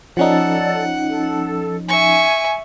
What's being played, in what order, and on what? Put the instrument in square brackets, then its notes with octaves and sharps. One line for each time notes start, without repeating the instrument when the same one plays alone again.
[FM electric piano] F3 C#4 D#4 [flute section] A4 D5 [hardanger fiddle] F#5
[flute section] A4
[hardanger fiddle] E5 C#6 [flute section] G#5